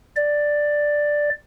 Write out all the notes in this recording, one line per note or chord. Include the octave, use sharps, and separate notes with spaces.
D5